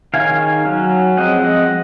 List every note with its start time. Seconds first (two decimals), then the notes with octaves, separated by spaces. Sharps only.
0.14 D#3 G#3 C#4 F5 G#5
0.66 F#3 C#4
1.17 F3 G#3 C4 D#5 F#5
1.44 D#5 F#5